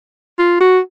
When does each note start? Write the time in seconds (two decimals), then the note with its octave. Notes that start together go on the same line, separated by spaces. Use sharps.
0.39 F4
0.60 F#4